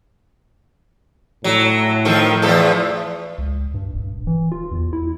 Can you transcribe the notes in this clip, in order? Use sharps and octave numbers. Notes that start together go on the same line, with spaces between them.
A2 F#3
D#3 F3 A4
E2 F3 A4
C#2
G2
D#1
E3
F4
E2
E4